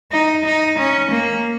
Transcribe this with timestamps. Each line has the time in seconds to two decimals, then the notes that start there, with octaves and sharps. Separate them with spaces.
0.12 D#4
0.45 D#4
0.79 C#4
1.12 A#3